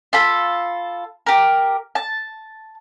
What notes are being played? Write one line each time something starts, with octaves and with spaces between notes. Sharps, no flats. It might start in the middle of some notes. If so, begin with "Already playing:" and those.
F4 A4 B5
G4 A#4
A5